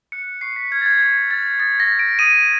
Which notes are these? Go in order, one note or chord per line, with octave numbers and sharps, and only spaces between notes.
F#6 C#7
C#6 C7
B6
F6 G#6
A6
G#6
C#6 G#6
F6 A6
D#6 A6
A#6
G6
D7
D#6 D#7